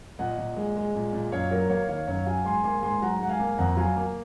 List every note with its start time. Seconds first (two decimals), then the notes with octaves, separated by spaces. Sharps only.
0.19 A#2 D#5 F#5
0.38 A#2
0.57 G#3
0.76 G#3
0.95 A#2
1.13 A#2
1.32 F#2 C#5 F5
1.51 F#3 A#4 C#5
1.69 A#3 C#5 F5
1.88 D#3 C#5 F5
2.07 F#2 C#5 F5
2.26 F#3 F5 G#5
2.45 G#2 G#5 C6
2.63 A#3 G#5 C6
2.83 G#2 G#5 C6
3.02 F#3 F#5 A#5
3.20 G#2 F#5
3.29 F5 G#5
3.40 A#3
3.58 F2 F#5 A#5
3.77 F#3 F5 G#5
3.96 A#3